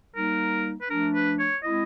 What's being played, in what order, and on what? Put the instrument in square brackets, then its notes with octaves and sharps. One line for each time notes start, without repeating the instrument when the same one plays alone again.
[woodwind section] G3 A#3 D#4 [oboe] A#4
[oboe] B4
[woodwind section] F3 A3 D4 [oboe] A#4
[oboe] B4
C#5
[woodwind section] G#3 C4 E4 [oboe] D#5